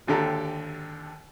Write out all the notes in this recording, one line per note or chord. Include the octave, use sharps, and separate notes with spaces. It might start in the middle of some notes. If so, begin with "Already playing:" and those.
G#1 D#2 D3 G4 A4 A#5